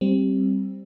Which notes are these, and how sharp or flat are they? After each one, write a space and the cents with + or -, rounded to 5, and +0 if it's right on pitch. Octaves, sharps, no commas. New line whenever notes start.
G3 -10 C4 +15